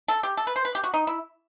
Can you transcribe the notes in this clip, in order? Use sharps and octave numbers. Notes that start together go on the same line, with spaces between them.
A4
G4
A4
B4
C5
B4
G4
F#4
D#4
E4